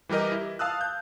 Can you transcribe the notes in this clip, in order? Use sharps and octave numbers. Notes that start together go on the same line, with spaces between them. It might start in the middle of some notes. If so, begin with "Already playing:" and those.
E3 G3 G4 A#4 D#5
E4
F5 A5 D#6 E6 F#6
G6